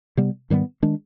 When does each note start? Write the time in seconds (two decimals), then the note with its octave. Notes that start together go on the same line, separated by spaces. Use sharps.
0.17 C3 G3 B3
0.50 G#2 D#3 G3 B3
0.82 D#3 G#3 D4